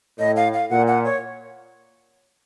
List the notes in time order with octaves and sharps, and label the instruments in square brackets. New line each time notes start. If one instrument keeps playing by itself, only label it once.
[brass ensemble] A2 [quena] D#5
[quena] F5
F5
[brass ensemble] A#2 [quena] F#5
[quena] F#5
C#5